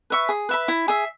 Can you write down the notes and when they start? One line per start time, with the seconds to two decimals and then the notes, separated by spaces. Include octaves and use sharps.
0.10 B4 E5 C#6
0.29 G#4
0.49 B4 E5 B5
0.68 E4
0.88 G#4 E5